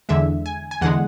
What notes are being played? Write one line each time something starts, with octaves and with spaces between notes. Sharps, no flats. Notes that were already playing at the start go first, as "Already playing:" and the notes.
E2 D3 G#3 E5
G#5
G#5
E2 D3 G#3 F#5